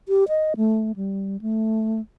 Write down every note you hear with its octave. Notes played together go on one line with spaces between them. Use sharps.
G4
D#5
A3
G3
A3